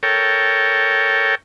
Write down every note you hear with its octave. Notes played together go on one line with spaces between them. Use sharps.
A4 A#4 C#5 G5